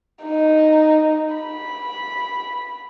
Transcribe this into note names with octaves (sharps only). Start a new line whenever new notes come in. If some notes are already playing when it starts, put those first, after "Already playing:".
D#4
B5